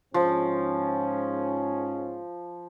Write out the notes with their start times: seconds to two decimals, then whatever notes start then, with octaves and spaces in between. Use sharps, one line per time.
0.14 G#2 F3 C#4